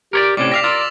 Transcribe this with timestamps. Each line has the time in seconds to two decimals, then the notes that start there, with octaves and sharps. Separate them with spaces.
0.13 G4 A#4 C#5 D5
0.37 A2 C3 C#4 D5 D6
0.52 G4 E5 F5 A#6 B6 F7
0.64 F4 A#4 E6 A6 A#6